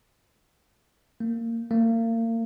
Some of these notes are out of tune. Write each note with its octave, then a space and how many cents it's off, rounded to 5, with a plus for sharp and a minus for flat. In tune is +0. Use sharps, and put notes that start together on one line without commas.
A#3 -20
A#3 -35